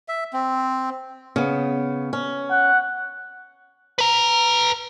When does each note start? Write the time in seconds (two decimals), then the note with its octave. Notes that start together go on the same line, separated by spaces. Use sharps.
0.08 E5
0.33 C4
1.36 C#3 B3
2.13 C#4
2.51 F#5
3.98 B4 A#5